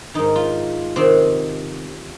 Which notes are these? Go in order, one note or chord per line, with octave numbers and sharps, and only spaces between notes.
G#2 D#3 D#4
F4
C3 D#3 C4